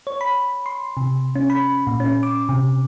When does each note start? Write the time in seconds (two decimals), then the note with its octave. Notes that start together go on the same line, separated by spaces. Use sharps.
0.07 C#5
0.21 B5
0.66 C6
0.97 C3
1.36 C#4
1.50 B5
1.87 A#2
2.00 C#4
2.23 D6
2.49 C3